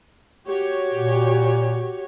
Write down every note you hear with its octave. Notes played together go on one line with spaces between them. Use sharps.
F#4 G4 C#5
A#2